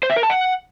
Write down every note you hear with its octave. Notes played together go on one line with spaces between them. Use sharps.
C5
E5
A#4
A5
F#5